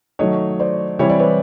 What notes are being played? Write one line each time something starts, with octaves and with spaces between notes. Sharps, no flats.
D#3 F#3 A3 C#5 D#5
C5 D5
E3 G3 C4 E4 C#5
D5
B4 C#5